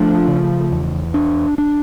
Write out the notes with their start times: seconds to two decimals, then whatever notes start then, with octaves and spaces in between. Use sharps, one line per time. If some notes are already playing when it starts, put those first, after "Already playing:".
Already playing: F3 A3 D4
0.28 C#3
0.72 E2
1.14 D4
1.58 D4